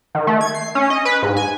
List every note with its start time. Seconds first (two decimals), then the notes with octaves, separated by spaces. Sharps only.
0.15 D#3
0.27 A3
0.41 G#6
0.55 C7
0.75 C#4
0.90 D#5
1.05 B4
1.22 G#2
1.37 G#5